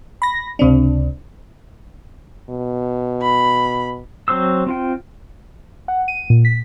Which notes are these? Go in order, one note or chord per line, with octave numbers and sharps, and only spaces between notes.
B5 A#6
C#2 C3 C4 D4
B2
B5
F#3 C4 C5 E6
C4 F4 G5
F#5
D#7
A#2
B6